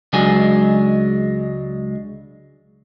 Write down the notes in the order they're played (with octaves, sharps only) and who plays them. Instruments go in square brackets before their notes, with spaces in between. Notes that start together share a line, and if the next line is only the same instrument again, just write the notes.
[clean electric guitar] C#2 F#3 G#3 D4 G#5